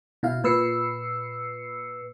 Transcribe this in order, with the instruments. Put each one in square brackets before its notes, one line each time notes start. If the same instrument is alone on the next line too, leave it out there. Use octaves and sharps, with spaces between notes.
[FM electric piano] B2 E4 F5
A#2 B4 E6 C7 C#7